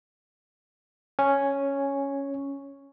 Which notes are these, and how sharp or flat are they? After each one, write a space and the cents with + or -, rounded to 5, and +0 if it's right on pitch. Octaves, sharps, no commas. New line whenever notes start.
C#4 +0 G#5 +0 C#6 +0